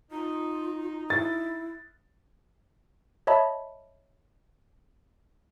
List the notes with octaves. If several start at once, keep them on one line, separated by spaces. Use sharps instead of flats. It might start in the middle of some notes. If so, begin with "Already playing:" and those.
D#4 F4
E4 A6
C#5 D#5 E5 A5 B5